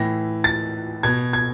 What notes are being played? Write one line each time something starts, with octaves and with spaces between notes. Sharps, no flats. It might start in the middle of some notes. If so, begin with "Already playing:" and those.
Already playing: A2 E3 A#6
A6
B2 G#6
G#6